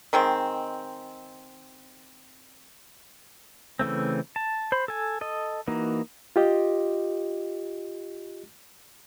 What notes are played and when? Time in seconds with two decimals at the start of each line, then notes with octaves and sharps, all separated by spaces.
0.13 D#3 G#3 C4
3.79 C#3 E3 A3 C4
4.36 A5
4.72 C5 B5
4.88 A4 G#5
5.21 A4 D#5
5.67 E3 A#3 D#4 F#4
6.36 F4 G4 D#5